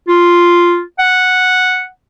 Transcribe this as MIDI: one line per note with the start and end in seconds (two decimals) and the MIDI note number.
0.08 0.81 65
0.99 1.86 78